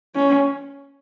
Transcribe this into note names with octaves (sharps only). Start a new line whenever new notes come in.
C#4